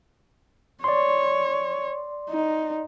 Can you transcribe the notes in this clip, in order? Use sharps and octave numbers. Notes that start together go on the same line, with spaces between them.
C#5 D5 C6
D#4